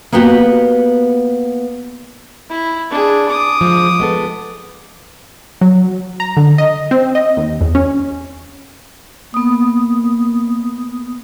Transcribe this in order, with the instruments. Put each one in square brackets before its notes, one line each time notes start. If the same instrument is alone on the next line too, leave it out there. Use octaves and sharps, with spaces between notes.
[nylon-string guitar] A#3 B3 F#4 G4
[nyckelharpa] E4
D4 G#4
D6 D#6
[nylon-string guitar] F3 G#3
G#3 B3 A4
[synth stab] F#3
A#5
D3
D#5
C4
D#5
D#2
E2
C#4
[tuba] A#3 [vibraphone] B3 D#6